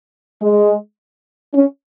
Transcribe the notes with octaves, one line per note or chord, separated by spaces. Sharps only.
G#3
C#4